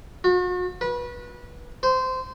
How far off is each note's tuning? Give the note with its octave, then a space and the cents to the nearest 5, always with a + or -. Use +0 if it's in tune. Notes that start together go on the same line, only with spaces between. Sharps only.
F#4 -40
B4 -25
C5 -20